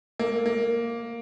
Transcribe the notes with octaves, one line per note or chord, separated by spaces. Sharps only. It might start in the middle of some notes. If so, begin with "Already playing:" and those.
A#3
A#3